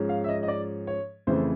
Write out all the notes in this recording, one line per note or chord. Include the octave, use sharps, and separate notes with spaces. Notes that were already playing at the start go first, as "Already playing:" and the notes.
Already playing: G#2 F3 G#3 C#4
F5
E5
D#5
D#5
D5
C#5
F2 C#3 E3 A3 C5